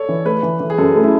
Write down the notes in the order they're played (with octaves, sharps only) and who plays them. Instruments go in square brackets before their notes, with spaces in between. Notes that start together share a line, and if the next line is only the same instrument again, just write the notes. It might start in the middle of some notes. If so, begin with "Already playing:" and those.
Already playing: [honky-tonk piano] A4 [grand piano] C#5 D5
[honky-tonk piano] E3
[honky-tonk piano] A3 [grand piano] B4
[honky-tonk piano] E3
E3
[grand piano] G#4
[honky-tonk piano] F#2 [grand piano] A4
[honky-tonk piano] A3
[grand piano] E4